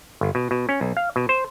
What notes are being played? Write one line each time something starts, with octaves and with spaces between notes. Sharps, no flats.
G1
B2
B2
C#4
B1
F5
B2
C5